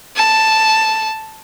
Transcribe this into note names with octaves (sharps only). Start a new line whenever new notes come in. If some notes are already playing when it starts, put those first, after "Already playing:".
A5